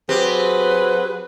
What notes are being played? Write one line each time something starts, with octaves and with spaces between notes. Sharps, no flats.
F#3 C4 G4 G#4 B4